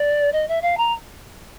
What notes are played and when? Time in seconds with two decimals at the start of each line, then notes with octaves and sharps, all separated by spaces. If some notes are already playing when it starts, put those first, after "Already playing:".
Already playing: D5
0.32 D#5
0.48 E5
0.62 F5
0.77 A#5